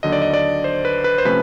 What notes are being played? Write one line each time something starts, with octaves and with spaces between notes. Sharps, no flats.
D#2 D3 F#3 D#5
D5
D#5
D5
C5
B4
B4
C5
C3 F3 A3 C#4 B4